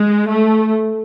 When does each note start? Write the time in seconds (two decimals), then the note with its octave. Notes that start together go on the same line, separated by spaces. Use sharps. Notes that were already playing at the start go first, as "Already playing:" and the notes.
Already playing: G#3
0.27 A3